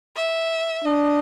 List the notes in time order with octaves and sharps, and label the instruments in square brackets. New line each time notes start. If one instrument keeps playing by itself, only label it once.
[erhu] E5
[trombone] D4 [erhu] D#5